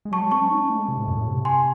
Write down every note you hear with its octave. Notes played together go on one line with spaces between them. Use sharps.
G#3
F#3 A5 C#6
G#3
C4 A5 C#6
C#4
D#4
C#4
A3
G#3
C3
A2
F#2
A2
C3
G#5 C6